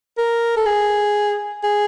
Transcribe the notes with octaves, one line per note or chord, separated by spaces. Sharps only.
A#4
A4
G#4
G#4